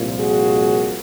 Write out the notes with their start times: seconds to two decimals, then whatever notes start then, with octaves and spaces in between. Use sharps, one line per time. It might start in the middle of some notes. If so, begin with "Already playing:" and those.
Already playing: C2 A#2 F3
0.19 F#4 G#4